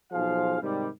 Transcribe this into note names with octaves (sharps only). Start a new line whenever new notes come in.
B1 F3 G#4 C5 F5
G#2 C3 D#3 G3